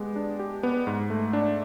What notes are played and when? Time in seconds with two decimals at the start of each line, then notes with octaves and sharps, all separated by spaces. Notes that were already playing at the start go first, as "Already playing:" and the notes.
Already playing: G#3 B3 G4
0.16 D4
0.39 G4
0.63 B3
0.87 G#2
1.10 A3
1.33 D4